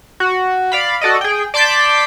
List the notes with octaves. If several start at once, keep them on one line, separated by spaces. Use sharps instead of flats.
F#4
D5 F5 B5
F#4 A4 D5 D#5
G#4 G5
D5 A5 C6 D6 G6 B6